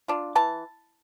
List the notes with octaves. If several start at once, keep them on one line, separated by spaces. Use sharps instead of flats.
D4 F4
E3 A5